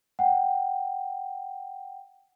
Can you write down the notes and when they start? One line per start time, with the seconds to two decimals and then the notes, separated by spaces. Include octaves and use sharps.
0.19 F#5 G5